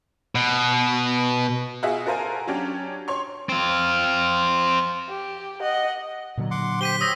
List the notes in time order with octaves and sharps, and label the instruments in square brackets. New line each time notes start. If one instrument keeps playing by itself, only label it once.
[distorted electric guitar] B2
[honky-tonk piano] F4 F#4 G#4 D#5 E5
F#4 A4 A#4 C5 F5 G#5
F#3 C#4 D4 G4
C#5 C6 C#6
[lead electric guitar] C4 F4
[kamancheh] G4
D#5 F#5
[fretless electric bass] A#2 D3 F#3
[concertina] F#5 C6 D6
[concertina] G4 C5 [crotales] B6 D#7 G7
[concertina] C#5 [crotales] D#6 E6 A#6